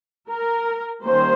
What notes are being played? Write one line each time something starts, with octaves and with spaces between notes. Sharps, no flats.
A#4
D#3 G3 A#3 C#4 C5